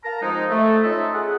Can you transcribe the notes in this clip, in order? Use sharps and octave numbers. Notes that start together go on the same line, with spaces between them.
A#4 F5 A5 A#5
F2 G#3 D#4
A3
C#4 D#4 F4 A4 D#5 E5
G#4 F#5